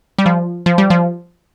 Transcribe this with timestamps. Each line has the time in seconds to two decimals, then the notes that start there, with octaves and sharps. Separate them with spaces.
0.18 G3
0.26 F3
0.66 F3
0.78 G3
0.90 F3